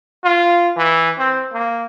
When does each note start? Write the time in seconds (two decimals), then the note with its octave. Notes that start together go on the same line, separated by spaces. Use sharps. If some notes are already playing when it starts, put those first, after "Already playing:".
0.24 F4
0.77 E3
1.18 C4
1.53 A#3